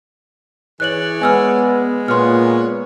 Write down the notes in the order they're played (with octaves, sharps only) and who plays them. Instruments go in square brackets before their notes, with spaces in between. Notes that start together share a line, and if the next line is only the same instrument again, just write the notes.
[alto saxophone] E3 [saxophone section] G#4 C#5 D5 [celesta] F#6 F#7
[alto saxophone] G#3 [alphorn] B3 [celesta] G#5 E6 F6
[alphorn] A#2 [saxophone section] B3 B4 C#5 [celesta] C6 F6